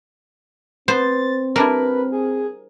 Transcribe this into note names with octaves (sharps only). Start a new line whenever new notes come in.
B3 C4 C5 A6
G3 D4 E4 A#4 B4
G#4